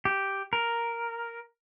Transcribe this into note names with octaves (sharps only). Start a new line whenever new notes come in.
G4
A#4